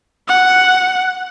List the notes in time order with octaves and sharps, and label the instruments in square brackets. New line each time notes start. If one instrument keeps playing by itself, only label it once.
[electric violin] F#5